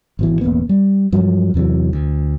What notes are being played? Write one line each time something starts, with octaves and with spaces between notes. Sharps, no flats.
G#1 B2 E3
E1 A1 A#3 B3
G3
G2 F3 F#3
E2 C3 E3 F#3
D2